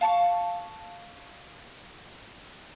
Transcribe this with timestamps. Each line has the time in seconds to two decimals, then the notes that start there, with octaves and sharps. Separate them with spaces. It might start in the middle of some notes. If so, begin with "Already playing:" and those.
0.01 F5 A5 C6 C#6